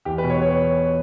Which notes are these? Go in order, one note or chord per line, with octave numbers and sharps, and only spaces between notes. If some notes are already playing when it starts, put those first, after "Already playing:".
E2 G4
B4
B2
C#5
C#5